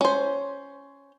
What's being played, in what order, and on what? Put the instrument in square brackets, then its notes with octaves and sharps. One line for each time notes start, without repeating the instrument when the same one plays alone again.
[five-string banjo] C#4 C5